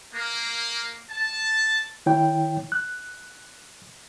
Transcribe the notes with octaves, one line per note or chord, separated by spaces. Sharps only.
A#3
A5
D#3 E4 C#5 G5
F#6